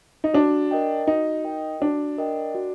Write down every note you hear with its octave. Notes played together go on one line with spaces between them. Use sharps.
D#4
D4 F#4
A#4 D#5 G5
D#4 F#4
A#4 D#5 G5
D4 F#4
A#4 D#5 G5
F#4